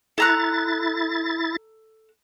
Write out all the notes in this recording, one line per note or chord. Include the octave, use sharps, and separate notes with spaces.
E4 A4 A#5 F#6 A6